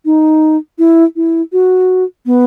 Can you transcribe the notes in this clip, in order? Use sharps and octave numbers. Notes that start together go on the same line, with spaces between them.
D#4
E4
E4
F#4
B3